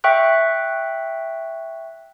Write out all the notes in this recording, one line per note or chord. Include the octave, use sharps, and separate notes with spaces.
E5 G5 C#6 F#6